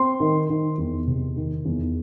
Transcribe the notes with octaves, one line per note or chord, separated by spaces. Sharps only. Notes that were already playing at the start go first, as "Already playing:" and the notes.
Already playing: C4 C6
D#3
D#3
E2
C3
D#3
E2